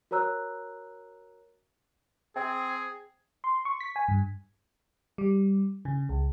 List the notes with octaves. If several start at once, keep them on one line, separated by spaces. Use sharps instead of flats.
F#4 A#4 C#5 A#5 E6 F#6
C4 G#4
C6
C#6
B6
G#5
G2
G3
C#3
C#2